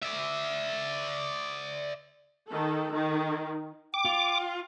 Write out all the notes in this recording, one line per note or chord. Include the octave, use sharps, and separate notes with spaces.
D5 E5
D#3 A4
D#3
G5 D6
F4